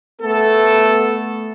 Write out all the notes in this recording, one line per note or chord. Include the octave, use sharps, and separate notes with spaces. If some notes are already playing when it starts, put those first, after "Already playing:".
A3 B3 A4